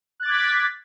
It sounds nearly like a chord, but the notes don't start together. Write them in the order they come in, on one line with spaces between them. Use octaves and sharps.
F#6 A6 D6 G#6 B6